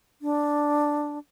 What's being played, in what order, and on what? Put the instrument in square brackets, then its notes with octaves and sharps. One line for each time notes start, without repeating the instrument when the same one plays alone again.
[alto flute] D4